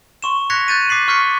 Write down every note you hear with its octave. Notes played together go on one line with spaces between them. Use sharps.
C6 C#6 E7
F#6 G#6 A#6 B6 C#7 F7
F#6 G6 A6 D#7
D6 B6 C7 F#7
C#6 F6 G6 B6 C#7